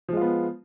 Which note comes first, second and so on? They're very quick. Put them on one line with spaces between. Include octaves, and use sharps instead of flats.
F3 G#3 F4 B3